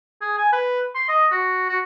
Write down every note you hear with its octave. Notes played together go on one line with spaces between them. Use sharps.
G#4
G#5
B4
C6
D#5
F#4
F#4